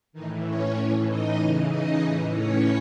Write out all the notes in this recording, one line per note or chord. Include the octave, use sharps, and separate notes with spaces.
A2 D#3 E3 D#4
C#4 C#5
A2 E3
D#4 D#5
C#3 E3
D#4 D#5
A2 E3
C#4 C#5